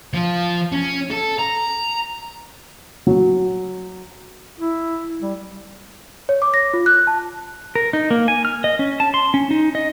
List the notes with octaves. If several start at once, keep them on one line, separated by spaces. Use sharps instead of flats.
F3
C#4
A4
A#5
F#3
E4
G3
C#5
D6
A#6
F4
F#6
A5
A#4
D#4
A#3
G#5
F6
D#5
C#4
A5
C6
C#4
D#4
D#5